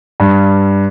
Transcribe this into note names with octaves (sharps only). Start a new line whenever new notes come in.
G2